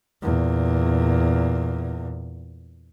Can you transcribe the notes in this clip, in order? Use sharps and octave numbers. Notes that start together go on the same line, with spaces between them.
E2 A#2